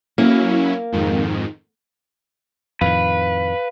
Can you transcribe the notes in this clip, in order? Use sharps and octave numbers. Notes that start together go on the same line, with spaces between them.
F#3 A#3 C#4 E4
F2 G#2 D#3
F2 A2 D#3 B4 F5